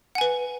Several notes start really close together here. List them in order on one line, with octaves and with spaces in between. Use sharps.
F#5 G#5 B4